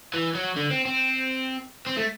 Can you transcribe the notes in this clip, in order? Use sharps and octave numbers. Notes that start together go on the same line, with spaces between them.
E3
F#3
D3
C4
C4
C4
A3